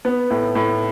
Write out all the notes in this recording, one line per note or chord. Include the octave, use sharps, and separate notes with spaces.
B3
A2
A2